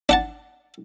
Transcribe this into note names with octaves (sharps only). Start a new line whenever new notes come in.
D4 F#5 A5